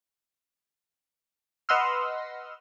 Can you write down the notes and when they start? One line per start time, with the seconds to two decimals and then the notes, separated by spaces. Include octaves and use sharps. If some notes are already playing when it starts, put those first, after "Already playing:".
1.69 B4 D#5 F#5 C6 E6 F6